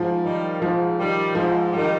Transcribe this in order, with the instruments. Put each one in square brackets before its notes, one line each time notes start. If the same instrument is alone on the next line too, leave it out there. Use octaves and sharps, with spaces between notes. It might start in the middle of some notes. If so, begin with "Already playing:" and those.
Already playing: [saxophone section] G#2 [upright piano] F3
[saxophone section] D#3 G3
[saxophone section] G#2 [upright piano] F3
[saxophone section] D#3 G3
[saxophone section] G#2 [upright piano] F3
[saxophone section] D#3 G3